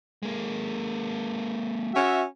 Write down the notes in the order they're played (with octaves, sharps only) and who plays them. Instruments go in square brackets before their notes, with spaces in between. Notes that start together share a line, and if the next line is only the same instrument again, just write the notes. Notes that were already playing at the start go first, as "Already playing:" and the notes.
[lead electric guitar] G#3 A#3
[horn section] C#4 F#4 E5